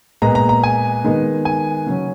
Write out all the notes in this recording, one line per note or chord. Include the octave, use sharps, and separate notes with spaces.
A#2 G#3 B3 A#5
A#5
A#5
G#5
D#3 G#3 B3
G#5
C#3 F#3 C#4